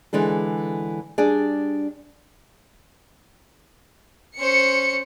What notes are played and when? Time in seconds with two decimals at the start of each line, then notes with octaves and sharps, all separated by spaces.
0.13 D3 E3 G#3 D4 A4
1.18 G3 D4 G#4 D5
4.39 C#4 C5 C#7